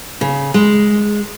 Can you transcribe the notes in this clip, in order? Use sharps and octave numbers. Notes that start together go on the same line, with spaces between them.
C#3
G#3